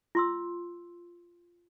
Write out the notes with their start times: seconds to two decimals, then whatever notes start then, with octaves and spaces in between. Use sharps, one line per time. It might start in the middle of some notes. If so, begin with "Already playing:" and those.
0.15 F4 C6 E6